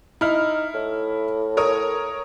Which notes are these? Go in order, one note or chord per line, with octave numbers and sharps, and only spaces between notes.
D#4 E4 F6
A2
A#4 C#5 D#6